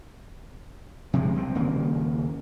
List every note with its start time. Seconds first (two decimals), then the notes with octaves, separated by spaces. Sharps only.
1.13 C3 F3 G#3
1.35 C2 C4
1.55 D#1 C#3 A#3